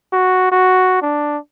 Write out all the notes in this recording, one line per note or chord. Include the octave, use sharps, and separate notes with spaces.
F#4
F#4
D4